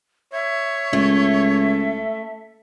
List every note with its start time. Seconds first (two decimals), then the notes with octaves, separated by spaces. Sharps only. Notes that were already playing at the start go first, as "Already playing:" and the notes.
0.33 C#5 E5
0.93 C#2 A3